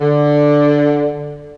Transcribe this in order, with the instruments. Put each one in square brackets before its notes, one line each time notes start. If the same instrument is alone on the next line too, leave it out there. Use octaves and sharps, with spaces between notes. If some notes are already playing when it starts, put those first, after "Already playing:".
[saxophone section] D3